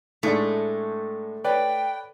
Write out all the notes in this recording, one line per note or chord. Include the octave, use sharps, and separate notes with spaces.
A2 G#3 A3 D4
B4 C#5 D5 G5